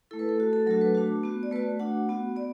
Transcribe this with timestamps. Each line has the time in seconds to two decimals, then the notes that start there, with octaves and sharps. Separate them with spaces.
0.11 A3 E4 A4
0.19 B4
0.29 A4
0.38 A3 F#4
0.53 A4
0.66 F#3 A3 D4 F#4 A4
0.81 B4
0.95 A3 D4 F#4
1.23 B3 F#4
1.43 D5
1.51 A3 F#4 B4
1.80 A3 D4 F#4 F#5
2.09 B3 F#4
2.36 B3 D5